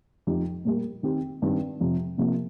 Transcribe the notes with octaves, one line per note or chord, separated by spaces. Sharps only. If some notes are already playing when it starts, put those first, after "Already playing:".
F2 F3 D#4 G4
A#2 G3 A#3
D#3 C4 G4
G2 D#3 C4
F2 C3 F3
C3 F3 A#3